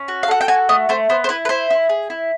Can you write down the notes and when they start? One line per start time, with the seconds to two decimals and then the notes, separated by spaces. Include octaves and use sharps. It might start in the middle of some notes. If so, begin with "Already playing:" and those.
Already playing: C#4
0.08 F#4
0.23 F5
0.28 A4 F#5
0.41 G5
0.48 F#4 G#5
0.69 A3 D#5
0.89 A3 C5
1.09 B3 C5
1.24 C5
1.29 E4 B4
1.45 B4
1.49 E4 C5
1.70 E4
1.89 G#4
2.10 E4